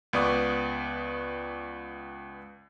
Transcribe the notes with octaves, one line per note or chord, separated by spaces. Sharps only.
C#2 B3 B4 D5 C#6 D#6